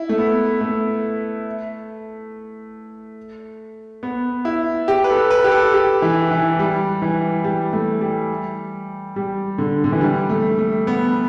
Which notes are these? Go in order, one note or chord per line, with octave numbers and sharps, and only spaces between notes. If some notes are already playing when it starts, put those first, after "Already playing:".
Already playing: E4
A3
B3
A3
B3
E4
G4
B4
A4
B4
G4
A4
G4
E3
E3
G3
E3
G3
A3
G3
G3
D3
D3
E3
G3
A3
A3
B3